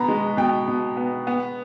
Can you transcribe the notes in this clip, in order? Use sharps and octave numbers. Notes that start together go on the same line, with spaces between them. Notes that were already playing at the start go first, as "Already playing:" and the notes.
Already playing: B2 B3 A#5 B5
G#3
B2 G5
B2
B3
B3